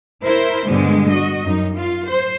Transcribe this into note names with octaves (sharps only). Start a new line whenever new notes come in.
E4 A#4 C5
G2 B2 D3 G3 G#3
F#4 D#5
F#2 D#4
F4
C5